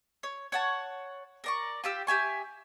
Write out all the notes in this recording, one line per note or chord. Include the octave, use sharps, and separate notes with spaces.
C#5
C#5 F#5 A5
A#4 D5 C#6
F4 G4 E6
G4 E5 G#5 C#6